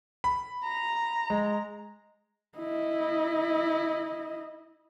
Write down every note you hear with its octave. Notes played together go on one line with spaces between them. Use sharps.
B5
A#5
G#3
E4 D#5